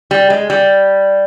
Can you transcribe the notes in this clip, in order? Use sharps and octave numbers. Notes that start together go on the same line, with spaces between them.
G3
G#3
G3